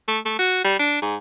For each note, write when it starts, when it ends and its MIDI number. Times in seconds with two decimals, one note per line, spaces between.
0.08 0.19 57
0.25 0.38 57
0.39 0.60 66
0.64 0.77 55
0.79 1.00 62
1.02 1.16 44